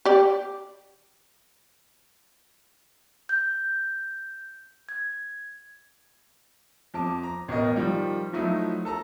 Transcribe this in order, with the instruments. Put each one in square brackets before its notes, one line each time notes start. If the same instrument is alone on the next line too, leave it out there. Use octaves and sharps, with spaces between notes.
[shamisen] G4 D5
[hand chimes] G6
G#6
[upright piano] F2 A5 D6
A#5
A1 B2 A#4 D#5
D#3 F3 G3
F3 F#3 A3 D#4 E4
A4 A5 A#5